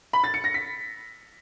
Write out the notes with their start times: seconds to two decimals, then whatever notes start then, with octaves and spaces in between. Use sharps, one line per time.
0.13 B5
0.24 A6
0.34 C#7
0.44 A#6
0.54 B6